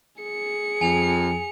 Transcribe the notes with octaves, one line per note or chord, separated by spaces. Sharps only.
G#4 C#7
F2 G#5 F7